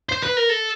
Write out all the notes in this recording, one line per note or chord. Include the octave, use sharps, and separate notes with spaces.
C5
B4
A#4
A4